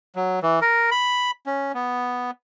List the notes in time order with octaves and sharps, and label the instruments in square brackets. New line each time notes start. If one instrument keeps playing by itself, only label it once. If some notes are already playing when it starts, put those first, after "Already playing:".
[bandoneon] F#3
E3
A#4
B5
C#4
B3